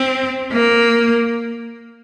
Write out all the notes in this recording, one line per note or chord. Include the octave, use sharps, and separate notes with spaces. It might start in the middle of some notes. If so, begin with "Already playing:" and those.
Already playing: C4
A#3